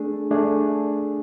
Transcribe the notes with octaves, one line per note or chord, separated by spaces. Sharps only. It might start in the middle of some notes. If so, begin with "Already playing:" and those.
Already playing: A3 D4 G#4
A3 D4 G#4